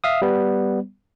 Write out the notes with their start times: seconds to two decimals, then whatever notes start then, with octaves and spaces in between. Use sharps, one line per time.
0.04 E5 F5 D#6
0.22 G3 B3